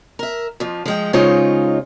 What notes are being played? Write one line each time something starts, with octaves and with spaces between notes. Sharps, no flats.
A#4 E5
F2 F3
F3 G#3 G5
C#3 G#3 D#4 F4 C5 C#5